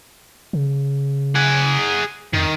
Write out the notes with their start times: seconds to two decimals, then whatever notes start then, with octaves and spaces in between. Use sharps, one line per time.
0.53 C#3
1.35 G#4 F#5
2.33 F2 D#3